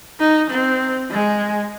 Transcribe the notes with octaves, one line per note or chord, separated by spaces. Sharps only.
D#4
C4
G#3